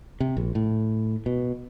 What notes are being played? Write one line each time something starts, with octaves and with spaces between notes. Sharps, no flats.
C3
A#1
A2
B2